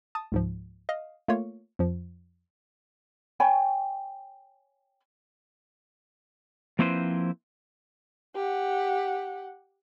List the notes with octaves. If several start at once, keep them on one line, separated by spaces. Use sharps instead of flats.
A5 D#6
C#2 G#2 F3
D#5 F5
A3 A#3 F4 C#5
F2 F3
C#5 G5 G#5 B5
F3 A#3 C4 E4 B4 C5
G4 F#5